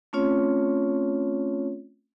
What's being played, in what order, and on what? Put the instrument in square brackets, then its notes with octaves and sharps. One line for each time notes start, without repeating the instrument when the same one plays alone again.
[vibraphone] A3 C4 C#4 F4 C#5